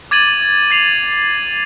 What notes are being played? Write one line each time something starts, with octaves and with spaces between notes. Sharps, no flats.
D6 G#6 A6 D#7 F#7
A6 C7 F7